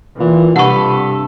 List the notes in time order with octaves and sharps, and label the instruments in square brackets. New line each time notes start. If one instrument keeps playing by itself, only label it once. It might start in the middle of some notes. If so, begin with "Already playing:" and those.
[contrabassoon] A#2 [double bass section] E3
[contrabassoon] G2 [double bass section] C3 [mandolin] A4 B4 [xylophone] F#5 C#6